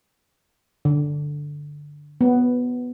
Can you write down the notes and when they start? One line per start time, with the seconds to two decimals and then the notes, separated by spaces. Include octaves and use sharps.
0.85 D3
2.21 B3